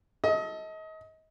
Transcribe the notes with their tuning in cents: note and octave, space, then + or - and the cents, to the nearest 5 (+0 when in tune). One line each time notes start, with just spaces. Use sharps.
A4 +0 D#5 +30